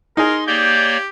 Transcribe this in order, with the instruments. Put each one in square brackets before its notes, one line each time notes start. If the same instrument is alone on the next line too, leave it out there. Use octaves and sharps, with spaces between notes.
[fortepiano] D#4 G#4 [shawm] A#4 [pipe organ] C6
[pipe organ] A#3 C#5 D5 [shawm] G4 [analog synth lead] G6